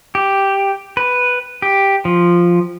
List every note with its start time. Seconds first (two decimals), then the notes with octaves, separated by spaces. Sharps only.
0.15 G4
0.97 B4
1.62 G4
2.05 F3